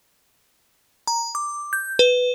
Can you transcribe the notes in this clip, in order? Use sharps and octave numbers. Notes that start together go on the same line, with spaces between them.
A#5
D6
G6
B4